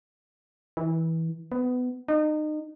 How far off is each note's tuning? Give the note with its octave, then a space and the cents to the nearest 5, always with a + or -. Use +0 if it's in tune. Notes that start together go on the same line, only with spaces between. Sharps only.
E3 -20
B3 +20
D#4 -30